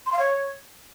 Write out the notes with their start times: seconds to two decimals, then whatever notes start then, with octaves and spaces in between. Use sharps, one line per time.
0.06 C6
0.13 F5
0.19 C#5